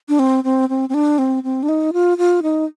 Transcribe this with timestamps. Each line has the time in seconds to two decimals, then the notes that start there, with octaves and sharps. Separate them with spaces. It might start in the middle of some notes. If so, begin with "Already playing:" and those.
0.09 D4
0.19 C4
0.44 C4
0.69 C4
0.89 C4
0.94 D4
1.18 C4
1.43 C4
1.63 D4
1.69 D#4
1.93 F4
2.18 F4
2.43 D#4